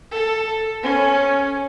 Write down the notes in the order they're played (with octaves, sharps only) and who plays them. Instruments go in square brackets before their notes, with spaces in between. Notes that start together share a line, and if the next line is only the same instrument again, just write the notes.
[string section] A4
C#4